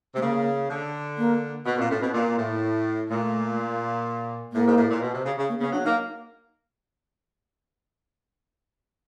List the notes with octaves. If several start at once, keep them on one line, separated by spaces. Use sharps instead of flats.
C3 A3
C#3 A#3
D3
A#3
B2 B3
A#2 C4
A2 C#4
B2 C4
A#2 A#3
A2
A#2 A3
A2 A#3
G#2
A2
A#2
B2
C3
C#3
C#3
A#3
C#3 B3
F#3 D4
A#3 D#4